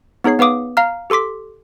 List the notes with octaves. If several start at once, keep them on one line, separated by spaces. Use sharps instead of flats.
B3 D#4 G#4 C#5 C7
B3 B4 F5 D6 D#6
F5 A#5 F6
G4 A4 C6 D6 B6